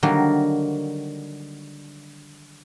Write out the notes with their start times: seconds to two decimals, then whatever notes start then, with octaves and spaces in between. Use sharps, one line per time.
0.03 D3 D#3 F#3 G3 A#3